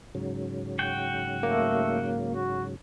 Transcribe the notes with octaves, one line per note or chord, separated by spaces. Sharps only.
G#2 C#3 F#3
F#4 G5
A3 A#3
F#4